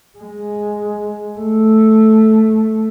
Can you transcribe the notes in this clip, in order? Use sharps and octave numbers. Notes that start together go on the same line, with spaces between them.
G#3
A3